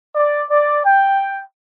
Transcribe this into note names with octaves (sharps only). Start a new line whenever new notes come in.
D5
D5
G5